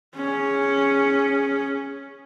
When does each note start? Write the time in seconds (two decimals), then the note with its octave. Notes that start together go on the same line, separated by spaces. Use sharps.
0.15 C#4 G#4